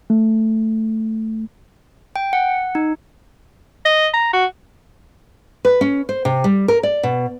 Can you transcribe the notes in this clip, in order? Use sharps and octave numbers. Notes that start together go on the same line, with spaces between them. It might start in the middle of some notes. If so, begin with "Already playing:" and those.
A3
G5
F#5
D#4
D#5
A#5
F#4
B4
C#4
C5
C3
G3
A#4
D5
B2